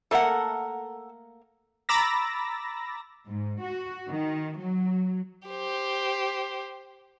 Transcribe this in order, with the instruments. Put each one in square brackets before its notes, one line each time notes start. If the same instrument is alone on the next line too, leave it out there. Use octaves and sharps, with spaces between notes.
[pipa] A3 A#3 A#4 [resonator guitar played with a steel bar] A4 F#5
[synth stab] A#5 B5 D6 E6 A6 A#6
[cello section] G#2
F#4
D#3
F#3
[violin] G4 C5